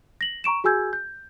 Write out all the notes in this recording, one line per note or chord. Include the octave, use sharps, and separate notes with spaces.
A#6 F#7
A#5 C#6 D7 E7
F#4 G#4 G#5 E6 G6 G#6
G6